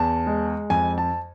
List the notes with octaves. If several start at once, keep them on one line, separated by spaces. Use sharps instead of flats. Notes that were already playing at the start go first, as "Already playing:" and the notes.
Already playing: E2 A5
G#3
F2 G#5
A5